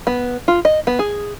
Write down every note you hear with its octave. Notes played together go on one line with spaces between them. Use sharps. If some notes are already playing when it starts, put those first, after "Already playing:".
B3
F4
D#5
B3
G#4